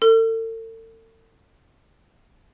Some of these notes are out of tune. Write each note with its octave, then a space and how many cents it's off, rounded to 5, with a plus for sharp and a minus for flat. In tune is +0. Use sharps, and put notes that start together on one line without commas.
A4 +40